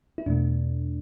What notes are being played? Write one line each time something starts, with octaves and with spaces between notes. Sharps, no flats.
E4
E2 B2 A3 D4